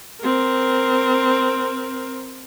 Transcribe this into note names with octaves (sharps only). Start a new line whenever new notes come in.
C4 A#4